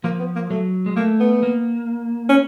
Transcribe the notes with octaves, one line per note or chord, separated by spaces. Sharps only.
F3 A#3
B3
A#3
F#3 A3
G#3
A3 A#3
B3
A#3
C#4